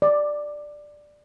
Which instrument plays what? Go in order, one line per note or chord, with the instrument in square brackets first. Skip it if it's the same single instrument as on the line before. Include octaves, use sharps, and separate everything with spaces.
[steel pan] D5